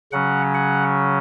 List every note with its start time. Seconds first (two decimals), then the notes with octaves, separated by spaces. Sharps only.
0.12 C#3 F#3 C#4 F#5
0.54 F#5